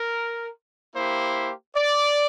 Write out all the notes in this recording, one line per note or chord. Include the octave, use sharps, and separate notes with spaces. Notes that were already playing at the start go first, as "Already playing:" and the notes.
Already playing: A#4
A#3 E4 G4 C5
D5